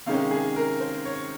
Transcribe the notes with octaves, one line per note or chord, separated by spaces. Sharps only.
C3 D#3 G#3 C#4 F5
G#4
A#4
C5
C#5